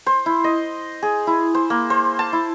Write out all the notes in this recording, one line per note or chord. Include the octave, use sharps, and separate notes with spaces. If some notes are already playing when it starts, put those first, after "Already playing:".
C5
E4
D#5
G#4
E4
C5
A#3
C5
A5
E4